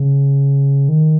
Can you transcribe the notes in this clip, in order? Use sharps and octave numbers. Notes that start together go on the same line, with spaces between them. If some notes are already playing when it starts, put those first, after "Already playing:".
Already playing: C#3
D#3